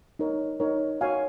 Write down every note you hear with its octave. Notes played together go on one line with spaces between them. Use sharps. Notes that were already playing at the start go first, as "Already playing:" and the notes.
D#4 A#4 C#5
D#4 A#4 C#5
F#4 C#5 F5 G#5